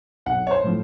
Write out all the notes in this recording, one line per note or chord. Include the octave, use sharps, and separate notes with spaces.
B1 F#5
C#5
C5
A2 F3